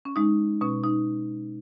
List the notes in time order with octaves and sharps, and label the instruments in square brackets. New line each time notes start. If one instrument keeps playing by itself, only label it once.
[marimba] C#4
G#3 D#4
B2 C#4
D#4